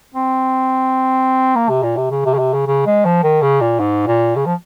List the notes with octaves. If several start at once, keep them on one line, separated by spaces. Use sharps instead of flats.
C4
A#3
C3
A#2
C3
C#3
C3
C#3
C3
C#3
C#3
G#3
F3
D#3
C#3
A#2
G#2
A#2
C#3
F3